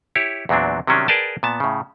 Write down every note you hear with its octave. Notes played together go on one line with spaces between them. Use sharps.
E4 G4 C#5
E2 A#2 F#3 C4 D4
C3 D#3 F#3 G3 C#4 D4
G#4 A#4 B4 D5 G5 A5
A#2 B3 A5
A2 C#3